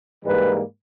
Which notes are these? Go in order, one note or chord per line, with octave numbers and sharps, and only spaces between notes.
G#2 E3 G3 A#3 B4